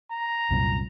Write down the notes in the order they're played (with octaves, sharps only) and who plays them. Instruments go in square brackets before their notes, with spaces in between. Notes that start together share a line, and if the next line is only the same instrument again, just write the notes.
[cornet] A#5
[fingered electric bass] C2 F#2 A#2